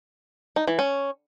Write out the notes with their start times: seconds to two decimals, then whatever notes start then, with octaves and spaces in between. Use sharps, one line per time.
0.56 D#4
0.68 E3
0.79 C#4